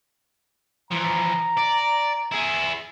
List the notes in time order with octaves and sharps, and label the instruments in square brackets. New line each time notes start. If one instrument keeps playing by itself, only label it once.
[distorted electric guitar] E3 F3 [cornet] A#5
[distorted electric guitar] D5
E4 G#4